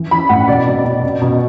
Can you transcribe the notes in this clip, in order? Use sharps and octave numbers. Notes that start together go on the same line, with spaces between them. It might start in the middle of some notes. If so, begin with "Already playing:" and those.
Already playing: E3
E3 B5
A2 F#5
B2 D5
B2
B2
B2
B2